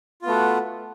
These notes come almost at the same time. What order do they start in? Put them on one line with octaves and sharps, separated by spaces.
F4 B3 A3 F#4